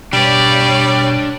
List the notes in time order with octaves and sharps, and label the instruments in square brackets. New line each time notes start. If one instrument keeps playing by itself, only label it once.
[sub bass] B2 [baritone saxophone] G3 [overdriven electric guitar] D4 B4 [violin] C#5 D5